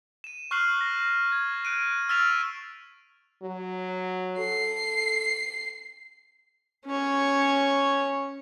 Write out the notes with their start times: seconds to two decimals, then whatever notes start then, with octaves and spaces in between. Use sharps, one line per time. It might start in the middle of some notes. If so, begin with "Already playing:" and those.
0.24 D#7 E7
0.51 C#6 F6 F#6 C7 F#7
0.81 A#6
1.32 G#6
1.65 F#6 D7 D#7
2.09 E6 F6 A6 B6 E7 F7
3.43 F#3
4.38 A4 C7
6.86 C#4 C#5